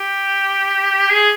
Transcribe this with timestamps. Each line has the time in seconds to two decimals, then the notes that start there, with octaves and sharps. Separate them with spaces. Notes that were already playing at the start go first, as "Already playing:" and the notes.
Already playing: G4
1.10 G#4